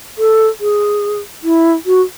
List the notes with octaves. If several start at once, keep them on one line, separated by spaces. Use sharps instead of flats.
A4
G#4
E4
F#4